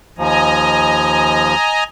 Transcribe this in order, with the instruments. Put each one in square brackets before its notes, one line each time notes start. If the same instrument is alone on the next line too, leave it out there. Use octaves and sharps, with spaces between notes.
[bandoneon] D#2 F3 [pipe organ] D#5 G#5 A#5